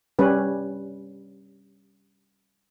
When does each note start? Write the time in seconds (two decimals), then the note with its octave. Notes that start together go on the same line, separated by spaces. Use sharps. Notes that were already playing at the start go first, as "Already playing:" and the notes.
0.19 G3 C#4 B4